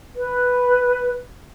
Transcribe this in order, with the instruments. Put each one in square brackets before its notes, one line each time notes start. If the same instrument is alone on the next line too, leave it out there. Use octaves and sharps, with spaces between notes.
[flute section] B4